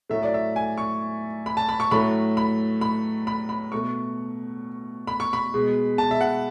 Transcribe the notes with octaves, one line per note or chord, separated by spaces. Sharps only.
A2 F#3 A3 E5
D5
E5
G#5
C#6
B5
A5
B5
C#6
A2 F#3 A3 B5
B5
B5
B5
B5
B2 A3 C#6
B5
C#6
B5
B2 G#3
A5
E5
F#5